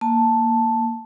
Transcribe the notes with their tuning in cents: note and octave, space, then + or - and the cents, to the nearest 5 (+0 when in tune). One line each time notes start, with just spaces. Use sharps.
A#3 +0 A5 +0